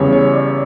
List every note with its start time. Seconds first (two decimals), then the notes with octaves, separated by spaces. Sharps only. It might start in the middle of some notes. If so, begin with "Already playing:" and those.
Already playing: E2 C#3 G3 C#5
0.13 C#5
0.34 D5